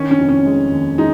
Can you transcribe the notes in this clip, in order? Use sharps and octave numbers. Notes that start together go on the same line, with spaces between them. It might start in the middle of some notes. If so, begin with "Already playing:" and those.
Already playing: D#3 C#4
C#4
F1
C#4
G#3
D#2
G#3 D#4